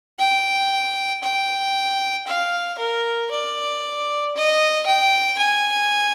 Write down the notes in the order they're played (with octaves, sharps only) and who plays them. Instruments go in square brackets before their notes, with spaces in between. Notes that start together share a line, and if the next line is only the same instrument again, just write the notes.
[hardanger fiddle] G5
G5
F5
A#4
D5
D#5
G5
G#5